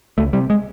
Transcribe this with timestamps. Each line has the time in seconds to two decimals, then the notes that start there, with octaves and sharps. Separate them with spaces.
0.18 C#2 A3
0.33 C3 G3
0.50 G#3